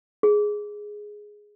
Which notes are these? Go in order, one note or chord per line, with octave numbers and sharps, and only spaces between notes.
G#4